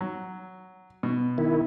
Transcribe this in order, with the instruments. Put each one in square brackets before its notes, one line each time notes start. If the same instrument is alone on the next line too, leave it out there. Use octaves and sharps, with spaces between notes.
[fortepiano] F#3
B2
[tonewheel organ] D#3 E4